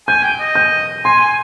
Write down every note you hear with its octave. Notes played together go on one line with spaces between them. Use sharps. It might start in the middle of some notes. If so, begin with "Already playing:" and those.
G#5 G6
G5
D#5
G6
G#5 C6
G#5